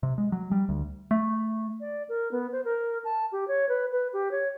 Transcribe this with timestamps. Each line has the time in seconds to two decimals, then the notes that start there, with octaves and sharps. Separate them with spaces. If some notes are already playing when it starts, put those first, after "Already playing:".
0.03 C3
0.18 G#3
0.32 F#3
0.51 G3
0.69 D2
1.11 A3
1.80 D5
2.09 A#4
2.31 B3
2.52 C5
2.65 A#4
3.04 A5
3.32 G4
3.48 C#5
3.69 B4
3.92 B4
4.13 G4
4.31 C#5